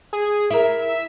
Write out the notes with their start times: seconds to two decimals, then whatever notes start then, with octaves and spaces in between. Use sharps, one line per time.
0.13 G#4
0.50 E4 A#4 E5